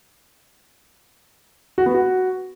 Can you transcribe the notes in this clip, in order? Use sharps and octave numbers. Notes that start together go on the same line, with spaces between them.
F#4
B3
F#4